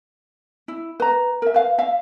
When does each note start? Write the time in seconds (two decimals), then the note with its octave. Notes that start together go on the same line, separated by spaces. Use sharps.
0.68 E4
1.00 B4 A#5
1.42 A#4 E5
1.54 B4 F5
1.78 E5 F5